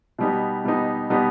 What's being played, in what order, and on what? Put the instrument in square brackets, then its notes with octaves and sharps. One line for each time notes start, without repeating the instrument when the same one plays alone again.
[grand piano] B2 G3 B3 D#4
B2 G3 B3 D#4
B2 G3 B3 D#4